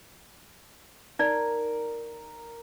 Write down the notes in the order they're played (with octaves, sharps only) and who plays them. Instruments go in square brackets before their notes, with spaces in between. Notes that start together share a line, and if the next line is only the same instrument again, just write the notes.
[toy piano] D#4 D5 [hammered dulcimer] A#4